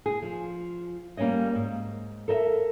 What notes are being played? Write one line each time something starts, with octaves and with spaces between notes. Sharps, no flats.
G#4
F3
G3 A#3 C#4 C#5 D#5
G#2
A4 A#4 D#5 E5